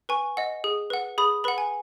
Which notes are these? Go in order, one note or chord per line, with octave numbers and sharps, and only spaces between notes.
B4 G#5 C#6
D#5 F#5
G#4
B4 F#5
G#4 B5 D#6
B4 F#5 B5
G#5